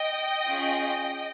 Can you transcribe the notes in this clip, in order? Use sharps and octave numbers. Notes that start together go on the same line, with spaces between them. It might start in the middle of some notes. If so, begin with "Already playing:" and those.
Already playing: D#5 G5
C#4 F4 G#4